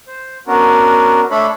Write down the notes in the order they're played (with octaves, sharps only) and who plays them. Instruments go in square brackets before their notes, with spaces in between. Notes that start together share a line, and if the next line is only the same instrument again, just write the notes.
[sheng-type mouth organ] C5
B3 C#4 D4 F#4 A#4
A3 D4 A4 C#5 B5